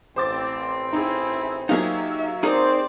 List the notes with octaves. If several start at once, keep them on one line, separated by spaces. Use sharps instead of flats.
A1 C4 C5 D6 A6
D#4 E4 G#4
F#3 A#3 D#4 F4 G4 G#4 E5
C4 D#4 G#4 A#4 C5 D5